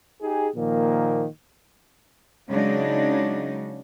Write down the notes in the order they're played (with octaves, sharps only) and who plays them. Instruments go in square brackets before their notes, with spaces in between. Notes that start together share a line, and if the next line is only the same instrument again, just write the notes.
[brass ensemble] D#4 G4 G#4
A#2 D#3 F3 A#3
[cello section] C#3 F#3 G#3 D4 D#4